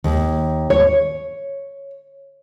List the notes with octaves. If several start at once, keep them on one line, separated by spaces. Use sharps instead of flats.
D#2
C#5